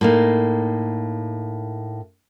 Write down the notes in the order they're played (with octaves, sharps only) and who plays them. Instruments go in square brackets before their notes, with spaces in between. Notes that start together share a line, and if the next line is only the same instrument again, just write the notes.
[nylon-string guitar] A2 A#3 D#4